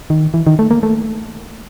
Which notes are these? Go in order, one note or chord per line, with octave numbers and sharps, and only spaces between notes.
D#3
E3
D#3
A3
A#3
A3